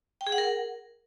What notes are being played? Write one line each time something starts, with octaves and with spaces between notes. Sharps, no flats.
G5
G#4
F#5
A#4